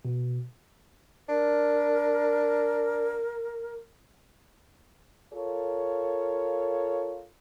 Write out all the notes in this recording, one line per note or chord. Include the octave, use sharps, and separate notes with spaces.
B2
D4 A#4
F4 A4 A#4 C#5